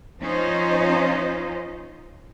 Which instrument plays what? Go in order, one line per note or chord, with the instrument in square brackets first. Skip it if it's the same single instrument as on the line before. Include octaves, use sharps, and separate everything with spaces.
[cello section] F3 C#4 D#4 F4 C5 D#5